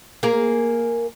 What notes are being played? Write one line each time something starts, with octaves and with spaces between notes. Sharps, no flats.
A#3 G#4 A#4